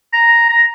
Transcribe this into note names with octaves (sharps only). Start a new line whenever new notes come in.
A#5
A#5